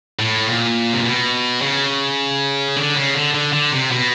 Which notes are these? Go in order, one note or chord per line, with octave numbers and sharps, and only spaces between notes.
A2
A#2
C3
B2
C#3
D3
C#3
D3
D3
D3
C3
B2